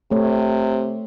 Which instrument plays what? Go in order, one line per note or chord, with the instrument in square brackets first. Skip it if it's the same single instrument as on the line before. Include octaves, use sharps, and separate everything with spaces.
[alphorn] C3 [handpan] A3 C#5